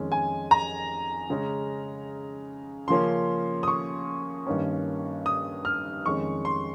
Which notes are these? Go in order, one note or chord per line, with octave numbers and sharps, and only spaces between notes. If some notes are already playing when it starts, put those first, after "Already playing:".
Already playing: F2 D#3 G#3 C#4
G#5
A#5
C#3 G#3 C#4
C#3 F3 A#3 C#4 C6
D#6
C#6
G2 D#3 A#3 C#4
D#6
F6
F2 D#3 G#3 C#4 C#6
C6